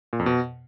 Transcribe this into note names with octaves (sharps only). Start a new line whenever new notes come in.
A#2
F2
B2